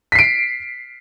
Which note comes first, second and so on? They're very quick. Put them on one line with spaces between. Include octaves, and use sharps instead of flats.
B6 C7 D7